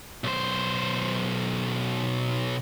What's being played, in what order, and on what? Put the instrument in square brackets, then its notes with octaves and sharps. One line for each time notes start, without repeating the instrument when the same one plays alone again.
[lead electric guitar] B1 C5